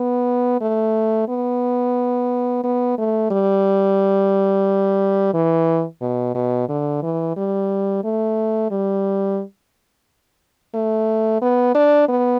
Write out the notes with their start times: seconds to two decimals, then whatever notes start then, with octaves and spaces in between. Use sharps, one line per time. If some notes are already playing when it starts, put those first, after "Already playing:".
Already playing: B3
0.61 A3
1.29 B3
2.64 B3
2.98 A3
3.31 G3
5.34 E3
6.01 B2
6.35 B2
6.69 D3
7.03 E3
7.36 G3
8.04 A3
8.71 G3
10.74 A3
11.42 B3
11.75 D4
12.09 B3